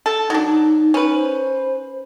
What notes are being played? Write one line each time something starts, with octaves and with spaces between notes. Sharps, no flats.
A4
F#3 D4 D#4
C#4 B4
C5